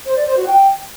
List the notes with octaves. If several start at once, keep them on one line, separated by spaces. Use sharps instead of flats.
C5
D5
C5
F#4
G5